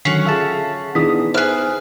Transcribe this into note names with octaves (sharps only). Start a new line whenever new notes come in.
D3 D#3 F#3 C#4 F#5 C7
F4 G#4 A4 E5 A5
E3 B3 D4 D#4 G#4 D#6 B6
G#4 B4 C5 E5 F6 F#6